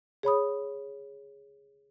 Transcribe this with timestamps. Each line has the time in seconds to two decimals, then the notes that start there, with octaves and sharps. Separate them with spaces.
0.23 G#4 C#5 B5 D#6